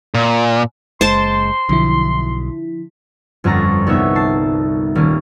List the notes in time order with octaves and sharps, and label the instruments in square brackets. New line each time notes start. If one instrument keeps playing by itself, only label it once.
[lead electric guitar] A#2
[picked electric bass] F#1 G#3 [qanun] C5 A5 [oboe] C6
[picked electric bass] B1 [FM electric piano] D3 F3 E4
[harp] G1 F2 C#4 D4 A#5 C#6
C2 B3 D#4 C#5 E5
A5 C7
D#1 A#3 C#4